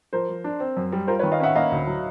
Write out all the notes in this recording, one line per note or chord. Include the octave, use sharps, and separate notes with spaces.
F3 A#4 C5
F3
D4
C4
F#2
G3
F4 A#4 C5
B4 C#5
D#3
D#5 F5
C#4 E5 F#5
A#3 D#5 F5
D2
F#3